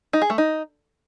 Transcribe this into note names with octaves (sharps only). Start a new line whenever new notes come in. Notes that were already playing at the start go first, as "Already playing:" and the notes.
D#4
G#4
A3
D#4